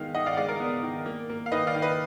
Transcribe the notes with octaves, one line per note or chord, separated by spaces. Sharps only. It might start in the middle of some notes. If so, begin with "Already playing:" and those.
Already playing: D#3 G#3 B3 F5
D#3 D#5 F#5
D5 F5
F#5
G#3 D5 F5
A#4 D5
B3
D#3
A#3
A#3
F5
D#3 B4 D#5
D5 F5
D#3
B4 D#5